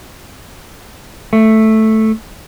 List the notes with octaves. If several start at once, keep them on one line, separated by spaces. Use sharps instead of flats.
A3